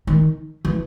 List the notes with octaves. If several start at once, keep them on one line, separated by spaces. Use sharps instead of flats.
D#3
E3